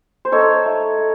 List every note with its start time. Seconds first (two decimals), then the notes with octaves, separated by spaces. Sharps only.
0.25 C5
0.32 D#4 A4 C#5
0.65 A3
0.98 A3